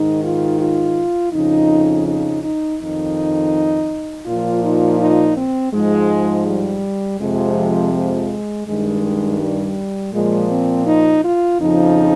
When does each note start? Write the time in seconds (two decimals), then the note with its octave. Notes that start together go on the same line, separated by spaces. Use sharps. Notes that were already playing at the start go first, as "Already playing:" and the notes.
Already playing: G#2 D#3 D#4
0.24 F4
0.61 F4
1.33 F2 C#3 F3 D#4
2.07 D#4
2.44 D#4
2.80 F2 D#3 D#4
4.27 A#2 F3 F4
4.64 D#4
5.01 D#4
5.37 C4
5.74 G#2 F3 G#3
6.46 G3
7.20 F2 C3 F3 G#3
7.94 G#3
8.67 G2 D#3 G#3
9.41 G3
10.13 A#2 F3 G#3
10.50 C4
10.86 D#4
11.24 F4
11.60 F2 C#3 F3 D#4